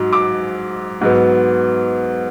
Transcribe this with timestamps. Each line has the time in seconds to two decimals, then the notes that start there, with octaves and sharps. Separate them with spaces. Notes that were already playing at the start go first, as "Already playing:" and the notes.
Already playing: G#2 F#3
0.13 D6
1.01 G#2 F#3 B3